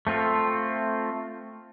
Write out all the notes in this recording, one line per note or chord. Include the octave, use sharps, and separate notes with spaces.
A3 C4 F4 A4